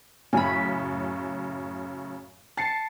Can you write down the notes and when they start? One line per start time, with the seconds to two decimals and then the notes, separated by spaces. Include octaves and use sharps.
0.33 F#2 A2 C#3 G#5 B5
2.57 A5 A6 C7 C#7